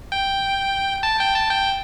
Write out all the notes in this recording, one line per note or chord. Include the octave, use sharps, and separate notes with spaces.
G5
A5
G5
A5
G5